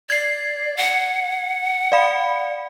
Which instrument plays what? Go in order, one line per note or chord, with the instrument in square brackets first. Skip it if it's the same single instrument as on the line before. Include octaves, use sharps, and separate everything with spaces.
[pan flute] D5 [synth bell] G#6 C7
[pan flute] F#5
[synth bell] D5 F5 B5